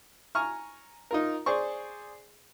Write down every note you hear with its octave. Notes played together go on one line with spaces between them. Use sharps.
G#5 A#5 C#6 F6
D#4 F4 A#4
G#4 C5 D5 C#6